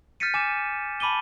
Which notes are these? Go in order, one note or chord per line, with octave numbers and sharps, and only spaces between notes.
F6 G6 A6 B6 C#7 D#7
G#5 D6 E7
A5 B5 D6 D#7 G7